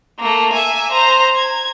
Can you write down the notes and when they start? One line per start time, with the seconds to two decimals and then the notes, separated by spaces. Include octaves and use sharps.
0.19 A3 A#3
0.52 E5 G#5
0.91 C5 A#5
1.36 G#6